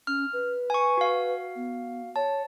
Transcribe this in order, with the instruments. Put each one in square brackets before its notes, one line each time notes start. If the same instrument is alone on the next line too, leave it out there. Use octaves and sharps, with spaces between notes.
[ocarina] C#4 [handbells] F6
[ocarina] B4
[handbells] G#5 C#6
F#4 F5
[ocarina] B3
[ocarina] C#5 [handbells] A5